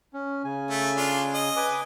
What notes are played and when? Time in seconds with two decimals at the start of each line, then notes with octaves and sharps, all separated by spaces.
0.14 C#4
0.45 C#3 G#5
0.70 A3
0.97 D4 F4
1.34 D#5
1.56 B4 G#5 D6